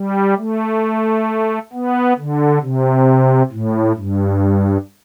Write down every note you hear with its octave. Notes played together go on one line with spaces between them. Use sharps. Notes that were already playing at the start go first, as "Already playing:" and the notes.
Already playing: G3
A3
B3
D3
C3
A2
G2